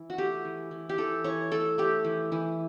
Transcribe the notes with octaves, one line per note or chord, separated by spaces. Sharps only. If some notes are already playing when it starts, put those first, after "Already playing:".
Already playing: E3
F#4
A3 G4
E3
E3
G4
E3 A4
E3 C#5
A3 A4
A3 G4
E3
E3